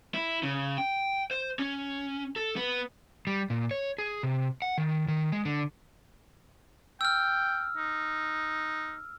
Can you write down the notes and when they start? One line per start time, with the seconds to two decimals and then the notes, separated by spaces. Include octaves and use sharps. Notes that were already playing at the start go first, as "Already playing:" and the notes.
0.14 E4
0.43 C#3
0.78 G5
1.31 C5
1.59 C#4
2.36 A4
2.56 B3
3.27 G3
3.50 A#2
3.71 C#5
3.98 G#4
4.23 C3
4.62 F#5
4.78 D#3
5.08 D#3
5.32 G#3
5.45 D3
7.01 G5 E6 F6
7.77 D#4